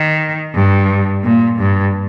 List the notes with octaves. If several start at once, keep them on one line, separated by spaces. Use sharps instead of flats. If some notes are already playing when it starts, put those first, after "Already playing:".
Already playing: D#3
G2
A#2
G2